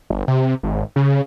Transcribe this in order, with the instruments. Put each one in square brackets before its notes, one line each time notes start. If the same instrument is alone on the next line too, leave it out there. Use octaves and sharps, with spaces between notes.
[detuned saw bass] G1
C3
G#1
C#3